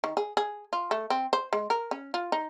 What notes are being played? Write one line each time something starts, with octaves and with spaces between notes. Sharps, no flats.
D#3
G#4
G#4
F4
A3
C4
C5
G#3
A#4
C#4
F4
D#4